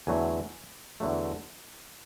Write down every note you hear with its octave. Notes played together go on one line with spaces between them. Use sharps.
E2 D3 F#3 A3 G#5
E2 D3 F#3 A3